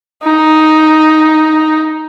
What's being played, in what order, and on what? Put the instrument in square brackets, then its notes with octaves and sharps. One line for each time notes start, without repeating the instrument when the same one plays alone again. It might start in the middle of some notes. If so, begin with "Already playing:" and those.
[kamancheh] D#4